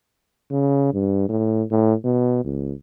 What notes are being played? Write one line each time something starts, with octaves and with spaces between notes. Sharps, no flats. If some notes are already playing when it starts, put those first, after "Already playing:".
C#3
G2
A2
A2
B2
C#2